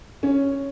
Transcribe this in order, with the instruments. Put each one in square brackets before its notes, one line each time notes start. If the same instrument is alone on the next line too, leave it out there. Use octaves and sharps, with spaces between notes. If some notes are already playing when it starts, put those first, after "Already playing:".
[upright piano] C#4